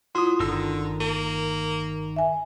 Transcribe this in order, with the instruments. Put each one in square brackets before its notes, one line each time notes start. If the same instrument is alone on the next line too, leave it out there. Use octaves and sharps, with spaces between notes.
[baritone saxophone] F#3 [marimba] E4 F4 [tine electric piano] C6 D#6
[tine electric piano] G1 [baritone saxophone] D3 [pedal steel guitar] D#3 A#4 E6
[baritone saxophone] A#3
[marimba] E5 G#5